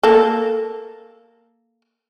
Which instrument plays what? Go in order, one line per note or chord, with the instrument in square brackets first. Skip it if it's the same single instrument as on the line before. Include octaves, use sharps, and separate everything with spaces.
[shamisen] A#3 A4